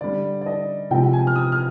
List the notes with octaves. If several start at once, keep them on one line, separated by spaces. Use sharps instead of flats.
D3 G3 D5
D5
D#5
C3 F3 G#3 G5
G#5
F6
D#6
F6